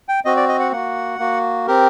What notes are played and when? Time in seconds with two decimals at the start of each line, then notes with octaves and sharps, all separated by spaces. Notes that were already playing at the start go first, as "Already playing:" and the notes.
0.09 G5
0.25 C4 F#4 D#5
0.37 D5
0.49 D#5
0.60 F#5
0.72 A#3 F#4 F#5
1.19 A#3 F#4
1.67 C4 G4 A#4